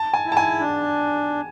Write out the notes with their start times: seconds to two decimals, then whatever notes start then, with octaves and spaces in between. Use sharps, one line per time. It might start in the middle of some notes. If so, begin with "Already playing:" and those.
Already playing: A5
0.14 G#5
0.25 E4
0.32 A5
0.37 G#5
0.60 D4